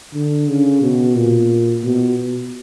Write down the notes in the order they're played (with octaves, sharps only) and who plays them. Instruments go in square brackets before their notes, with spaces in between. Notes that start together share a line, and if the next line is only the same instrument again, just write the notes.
[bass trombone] D3
C#3
B2
A#2
B2